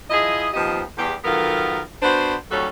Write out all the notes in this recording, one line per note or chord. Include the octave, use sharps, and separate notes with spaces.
F3 E4 G#4 D#5
D#2 F3 B3 C4 G4 D#5
E2 G4
D#3 F#3 B3 F4 A4 A#4
B3 D4 F#4 C5
D#2 G3 C#4 F#4 A4